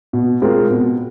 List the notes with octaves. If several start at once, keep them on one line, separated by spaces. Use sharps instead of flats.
B2
G#3 C4 F4 A#4
B2